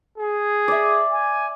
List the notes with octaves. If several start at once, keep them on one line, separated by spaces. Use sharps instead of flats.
G#4
D5 E5
G#5